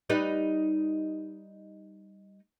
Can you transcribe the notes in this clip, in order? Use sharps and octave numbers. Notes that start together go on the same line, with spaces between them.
G3 D#4 B4